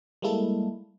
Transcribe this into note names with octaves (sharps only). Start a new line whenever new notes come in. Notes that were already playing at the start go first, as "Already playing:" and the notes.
G3 G#3 A#3 E4 A4